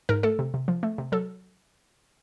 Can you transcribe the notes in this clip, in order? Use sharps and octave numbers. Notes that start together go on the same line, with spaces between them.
G#2 A#4
A3 A4
C3
C3
F3
A3
C3
F#3 A4